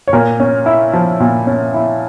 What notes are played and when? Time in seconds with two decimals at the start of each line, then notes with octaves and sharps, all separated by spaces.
0.08 C#5
0.13 A#2 A#4
0.40 C#4
0.66 E4
0.93 F3
1.20 A#2
1.47 C#4
1.74 E4